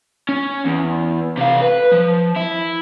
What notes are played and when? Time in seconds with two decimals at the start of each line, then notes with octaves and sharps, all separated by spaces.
0.29 C#4
0.65 E2
1.38 C3 F5
1.62 B4
1.92 F3
2.37 E4